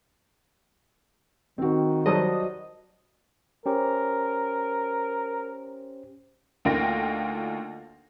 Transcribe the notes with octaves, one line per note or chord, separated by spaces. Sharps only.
D#3 C4 F#4
F#3 G3 C5 D#5 A5 D#6
C#4 G4 A#4 C5
D2 A#3 D#4 F4 G5 A#6